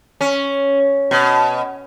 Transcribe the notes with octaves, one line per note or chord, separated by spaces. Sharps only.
C#4
B2